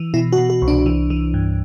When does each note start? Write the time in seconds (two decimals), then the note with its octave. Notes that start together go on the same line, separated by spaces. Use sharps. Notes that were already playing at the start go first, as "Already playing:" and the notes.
Already playing: E3
0.14 B2 E4
0.32 F#4
0.38 B2
0.50 F#4
0.62 C2
0.68 D4
0.86 E3
1.10 E3
1.34 G2